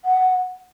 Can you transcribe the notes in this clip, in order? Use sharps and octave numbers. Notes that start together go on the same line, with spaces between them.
F#5